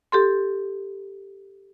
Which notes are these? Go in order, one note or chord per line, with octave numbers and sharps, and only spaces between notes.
G4 A4 C6